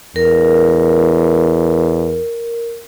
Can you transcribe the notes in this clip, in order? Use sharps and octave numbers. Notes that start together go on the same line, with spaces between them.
E2 A#4